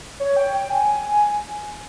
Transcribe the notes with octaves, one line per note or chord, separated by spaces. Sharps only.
C#5
G5
G5
G#5